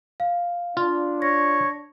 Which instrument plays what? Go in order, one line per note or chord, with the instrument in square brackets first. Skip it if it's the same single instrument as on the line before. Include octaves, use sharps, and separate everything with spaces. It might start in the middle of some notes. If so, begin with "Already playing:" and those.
[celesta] F5
[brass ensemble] D4 [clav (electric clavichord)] F4
[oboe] C#5 [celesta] A#6